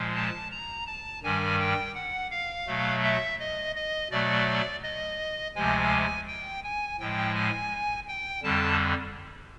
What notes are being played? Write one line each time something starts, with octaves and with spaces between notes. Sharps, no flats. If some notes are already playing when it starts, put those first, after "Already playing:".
Already playing: A#2 F3 G#3
A5
A#5
A5
G2 D#3 G3 G#5
G5
F#5
F5
B2 F#3 A3
E5
D#5
D#5
B2 F#3 A3 D5
D#5
D2 C3 F3 G#3 G#5
G5
G#5
A2 F3 G#3 G5
G#5
G5
F2 D3 G3 A5